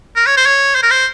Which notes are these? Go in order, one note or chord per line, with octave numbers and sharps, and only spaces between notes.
A#4
C#5
C5
C#5
C5
A#4
C5